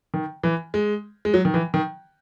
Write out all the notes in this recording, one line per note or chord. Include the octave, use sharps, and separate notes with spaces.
D#3
E3
G#3
G#3
F#3
D#3
E3
D#3